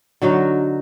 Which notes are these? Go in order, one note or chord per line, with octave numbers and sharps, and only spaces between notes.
D3 F#3 D#4 F#4